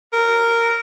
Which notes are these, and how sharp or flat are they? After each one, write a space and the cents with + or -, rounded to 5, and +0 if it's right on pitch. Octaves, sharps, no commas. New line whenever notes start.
A#4 -10